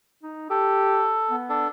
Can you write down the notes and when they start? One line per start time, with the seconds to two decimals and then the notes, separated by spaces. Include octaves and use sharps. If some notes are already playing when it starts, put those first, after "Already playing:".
0.23 D#4
0.50 G4 A4
1.31 B3
1.49 D4 A4